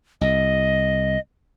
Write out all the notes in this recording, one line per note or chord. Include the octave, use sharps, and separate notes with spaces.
C2 D#5